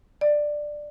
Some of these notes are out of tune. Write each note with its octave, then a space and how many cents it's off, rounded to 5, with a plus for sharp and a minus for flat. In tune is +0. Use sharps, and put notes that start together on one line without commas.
D5 +10